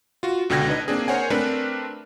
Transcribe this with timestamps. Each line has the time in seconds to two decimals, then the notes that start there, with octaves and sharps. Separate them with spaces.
0.23 F4 F#4
0.50 C#2 B2 D3 G5 G#6 A#6
0.67 D4 D#4 B4 D#5
0.88 A#3 C4 D4 G#4
1.08 A#4 C5 C#5 F#5 G#5
1.30 A3 C4 D4 A#4 B4